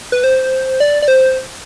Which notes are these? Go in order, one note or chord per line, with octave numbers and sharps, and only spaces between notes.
B4
C5
D5
D5
C5